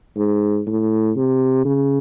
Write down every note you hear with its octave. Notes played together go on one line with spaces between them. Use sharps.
G#2
A2
C3
C#3